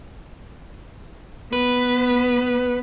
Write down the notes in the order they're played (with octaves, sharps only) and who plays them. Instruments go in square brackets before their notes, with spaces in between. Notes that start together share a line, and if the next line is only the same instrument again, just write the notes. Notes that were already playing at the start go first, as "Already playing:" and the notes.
[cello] B3 [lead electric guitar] B4